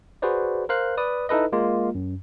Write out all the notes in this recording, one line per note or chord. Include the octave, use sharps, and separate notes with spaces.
F#4 G#4 B4 C5 D5
A#4 C5 F5 F#6
B4 D5 D#6
D#4 E4 A4 B4 D#5
G#3 A#3 F4
F#2